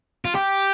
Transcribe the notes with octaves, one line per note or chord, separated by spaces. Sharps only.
F4
G4